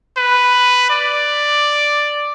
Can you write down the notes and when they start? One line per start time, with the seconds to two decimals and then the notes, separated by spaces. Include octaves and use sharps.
0.17 B4
0.90 D5